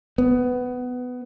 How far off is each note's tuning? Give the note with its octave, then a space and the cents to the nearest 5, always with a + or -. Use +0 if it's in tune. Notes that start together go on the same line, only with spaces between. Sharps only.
B3 +15